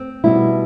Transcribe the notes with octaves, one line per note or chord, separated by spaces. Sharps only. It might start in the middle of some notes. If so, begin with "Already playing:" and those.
Already playing: C4
B2 G3 E4